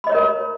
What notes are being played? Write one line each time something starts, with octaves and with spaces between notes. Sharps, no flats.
A#4 C#5 D#5 A#5 B5